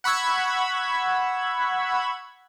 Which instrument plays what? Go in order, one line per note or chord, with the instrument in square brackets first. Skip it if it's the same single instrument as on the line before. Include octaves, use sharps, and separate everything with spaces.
[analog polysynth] F#5 B5 C#6 E6 G#6